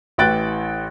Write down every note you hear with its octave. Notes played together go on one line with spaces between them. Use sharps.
A1 E3 G5 F#6 A6 D7